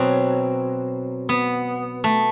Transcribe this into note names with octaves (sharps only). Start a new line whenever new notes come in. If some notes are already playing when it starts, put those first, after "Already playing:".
Already playing: B2 F#3 C4
B3
A3